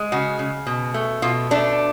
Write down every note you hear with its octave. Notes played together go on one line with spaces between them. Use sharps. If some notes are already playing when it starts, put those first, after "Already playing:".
Already playing: G#3
C#3 F#4
C#3
B2
A3
B2 F4
A3 D4